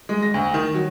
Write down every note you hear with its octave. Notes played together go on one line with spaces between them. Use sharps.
G#3
A#6
D2
D#3
F#3